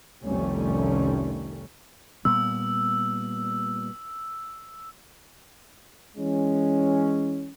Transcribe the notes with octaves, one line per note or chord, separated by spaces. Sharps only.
F1 C2 D#3 G3 A3 C#4
A#2 G3 B3 E6
E3 G#3 C#4